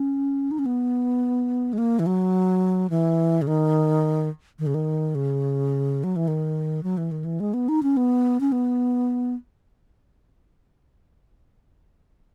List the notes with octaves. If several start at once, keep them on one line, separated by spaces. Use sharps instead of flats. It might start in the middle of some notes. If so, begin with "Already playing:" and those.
Already playing: C#4
D#4
C#4
B3
G#3
A#3
E3
F#3
E3
C#3
D#3
D#3
C#3
D#3
C#3
F#3
E3
D#3
F#3
E3
D#3
E3
G#3
B3
D#4
C#4
B3
C#4
B3